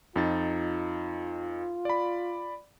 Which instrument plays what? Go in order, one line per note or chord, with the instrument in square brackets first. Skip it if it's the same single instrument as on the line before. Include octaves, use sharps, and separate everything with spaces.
[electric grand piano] F2 D#4 A6 [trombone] F4
[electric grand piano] D5 B5